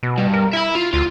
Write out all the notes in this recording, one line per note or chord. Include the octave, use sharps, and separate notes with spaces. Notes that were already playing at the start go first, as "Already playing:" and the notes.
B2
G2
A#4
E4 E5 B5
F4
D2 F4